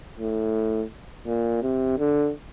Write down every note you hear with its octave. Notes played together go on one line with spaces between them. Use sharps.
A2
A#2
C3
D3